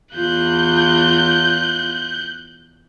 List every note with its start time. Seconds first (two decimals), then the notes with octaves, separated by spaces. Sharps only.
0.14 E2 F4 F#6 G6